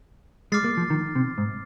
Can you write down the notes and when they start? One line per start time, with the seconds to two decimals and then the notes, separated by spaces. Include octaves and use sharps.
0.52 G#3 D6 F6 A6 C7
0.64 A#3
0.77 F3
0.90 D#3
1.15 C3
1.38 G#2